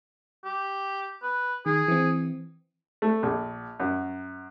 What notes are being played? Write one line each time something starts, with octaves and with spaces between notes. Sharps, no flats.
G4
B4
D#3 G#4
E3 C4
A3
A#1
F#2